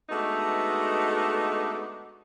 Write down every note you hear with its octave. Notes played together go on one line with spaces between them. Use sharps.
G#3 A3 B3 D4 D#4 F#4